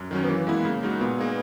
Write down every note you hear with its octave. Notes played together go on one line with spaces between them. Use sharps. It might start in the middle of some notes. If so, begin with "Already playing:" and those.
Already playing: F#2
D#3 F#3 C#4
B3
E3 A#3
G#3 B3 E4
C#3
G#3 D#4 F#4
A#2 B3
A#3 D#4 G#4